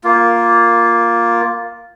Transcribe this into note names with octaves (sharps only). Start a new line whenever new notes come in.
A#3 F4